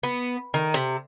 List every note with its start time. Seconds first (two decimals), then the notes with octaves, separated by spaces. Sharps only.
0.03 B3
0.54 D#3
0.74 C3